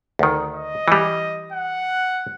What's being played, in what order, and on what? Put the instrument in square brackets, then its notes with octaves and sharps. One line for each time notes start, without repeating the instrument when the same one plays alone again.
[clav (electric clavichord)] D2 D#3
[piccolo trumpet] D#5
[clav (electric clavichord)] E3 G3
[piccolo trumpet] F#5